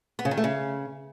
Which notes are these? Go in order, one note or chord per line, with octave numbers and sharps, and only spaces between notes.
B3
C#3
D#3
A3
C#3